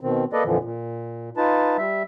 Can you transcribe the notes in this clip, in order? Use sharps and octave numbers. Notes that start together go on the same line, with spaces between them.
B2 D#3 C4
A#3 A4 B4 D5 D#5
F2 A#2 D3 E3 F3
A#2
D#4 F4 B4 A5
G3 E5